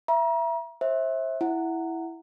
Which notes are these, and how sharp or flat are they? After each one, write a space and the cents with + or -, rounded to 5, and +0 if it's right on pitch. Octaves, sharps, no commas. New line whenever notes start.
E5 +20 A#5 +35
C5 +30 E5 -20
E4 +0 F#5 +0